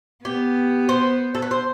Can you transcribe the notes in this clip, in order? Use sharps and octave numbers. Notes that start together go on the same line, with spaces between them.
B3 G4
C5
A4
B4
C5